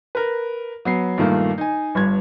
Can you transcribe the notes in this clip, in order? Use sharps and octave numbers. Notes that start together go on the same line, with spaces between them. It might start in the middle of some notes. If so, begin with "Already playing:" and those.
A#4 B4
F#3 B3 C7
G2 A#2 D#3 A3 A#3
D#4 G#5
G1 G2 G#6